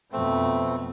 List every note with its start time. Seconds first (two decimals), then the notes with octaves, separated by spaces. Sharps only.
0.12 F2 B2 A3 C4